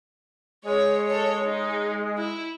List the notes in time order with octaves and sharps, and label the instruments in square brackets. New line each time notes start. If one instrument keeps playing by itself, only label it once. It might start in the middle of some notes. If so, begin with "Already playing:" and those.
[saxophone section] G#3 [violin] C#5
[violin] A4 C#5
D#4
E4